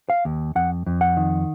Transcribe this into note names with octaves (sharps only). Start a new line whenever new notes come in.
F5
D#2
F2 F#5
F2
F#5
D#3